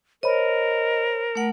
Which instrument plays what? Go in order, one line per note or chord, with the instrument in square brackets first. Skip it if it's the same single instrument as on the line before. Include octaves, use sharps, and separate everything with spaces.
[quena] A#4 [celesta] C5 C#5 B5 [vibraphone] D#5
[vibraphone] A3 F#5